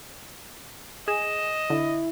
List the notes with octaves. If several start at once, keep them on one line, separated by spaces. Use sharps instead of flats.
G#4 D#5 E7
D3 E4